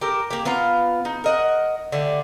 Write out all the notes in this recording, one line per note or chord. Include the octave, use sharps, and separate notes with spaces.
G4 A4 A#4
A#3 G4
B3 F4 F5 A#5
D#4
A#4 D#5 F#5
D3 A3 G4